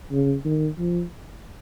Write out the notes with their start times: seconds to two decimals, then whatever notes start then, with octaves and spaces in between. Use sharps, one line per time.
0.12 C#3
0.45 D#3
0.79 F3